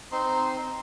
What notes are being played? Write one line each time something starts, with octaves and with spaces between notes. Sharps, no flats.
C4 D#4 C6